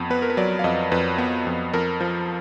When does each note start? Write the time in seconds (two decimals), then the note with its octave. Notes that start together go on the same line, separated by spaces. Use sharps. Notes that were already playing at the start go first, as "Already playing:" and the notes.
Already playing: F2 B3
0.10 B3 B4
0.22 A#4
0.30 B4
0.37 F#3 D5
0.59 F5
0.64 F2 D#5
0.91 F2 B4
1.18 B3
1.47 F2
1.73 F2 A#4
2.01 F3